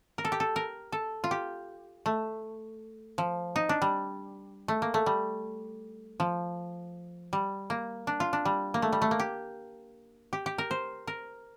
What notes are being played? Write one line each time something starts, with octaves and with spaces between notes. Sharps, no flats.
A#4
A4
G4
A4
A#4
A4
F4
G4
A3
F3
D#4
D4
G3
A3
A#3
A3
G3
F3
G3
A#3
D4
F4
D4
G3
A#3
A3
G3
A3
A#3
G4
G4
G4
A#4
C5
A#4